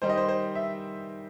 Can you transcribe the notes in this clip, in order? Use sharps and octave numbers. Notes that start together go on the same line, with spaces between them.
D#3 G3 D#4 C5
D#5
C5
C5
E5